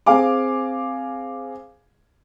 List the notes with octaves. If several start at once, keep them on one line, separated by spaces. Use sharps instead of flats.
C4 G#4 F5 G#5 D6